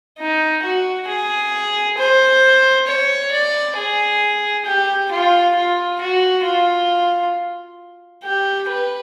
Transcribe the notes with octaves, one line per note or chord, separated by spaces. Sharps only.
D#4
F#4
G#4
C5
C#5
D5
G#4
G4
F4
F4
F#4
F4
G4
B4